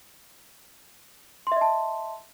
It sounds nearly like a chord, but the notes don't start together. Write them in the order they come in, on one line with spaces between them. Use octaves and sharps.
C6 E5 D#5 A5